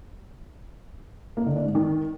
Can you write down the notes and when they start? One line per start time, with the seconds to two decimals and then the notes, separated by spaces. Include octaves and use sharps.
1.37 A#3
1.46 D3
1.56 D4
1.65 G#2
1.75 D#3